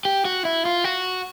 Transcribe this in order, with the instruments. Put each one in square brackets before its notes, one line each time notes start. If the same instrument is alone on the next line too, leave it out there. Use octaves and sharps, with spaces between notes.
[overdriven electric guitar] G4
F#4
E4
F4
F#4